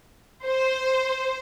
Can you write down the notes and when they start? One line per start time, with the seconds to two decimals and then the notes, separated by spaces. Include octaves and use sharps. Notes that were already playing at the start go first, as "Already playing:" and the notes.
0.46 C5